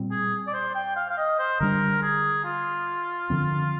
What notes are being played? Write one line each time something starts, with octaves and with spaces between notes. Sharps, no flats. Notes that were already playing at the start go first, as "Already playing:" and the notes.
Already playing: A#2 G3 C4
G#4
D5
C5
G5
F5
F5
D#5
C5
D3 G3 D4 A#4
G#4
F4
D3 F3 C4